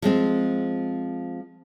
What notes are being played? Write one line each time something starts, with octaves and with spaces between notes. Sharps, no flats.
F3 G#3 C4